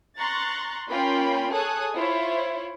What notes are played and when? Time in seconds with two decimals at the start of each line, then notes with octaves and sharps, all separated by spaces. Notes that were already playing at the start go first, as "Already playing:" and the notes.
0.19 A#5 C6 C#6 F#6 A6
0.90 A#3 C#4 F4 G5 B5 C6
1.52 G#4 A4 C#5 G#5 D#6 F#6
1.95 E4 F4 C5 C#5